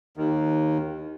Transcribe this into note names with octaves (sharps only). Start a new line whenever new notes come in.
D#2 D#3